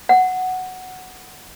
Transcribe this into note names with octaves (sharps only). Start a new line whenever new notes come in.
F#5